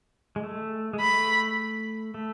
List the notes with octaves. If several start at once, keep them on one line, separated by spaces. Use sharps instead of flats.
G#3
A3
G#3
A3 B5
A3